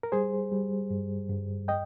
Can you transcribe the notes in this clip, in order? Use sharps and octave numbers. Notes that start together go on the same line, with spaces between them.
A#4
G3 G#4 C5
G3
G2
G2
D#5 G5